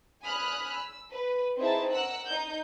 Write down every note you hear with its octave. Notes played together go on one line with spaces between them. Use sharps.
G#5 B5 D#6 F6 F#6
E6
B4
C4 D#4 E4 G#4 E5 A5
A#4 F#5 E6 F#6
D#4 G6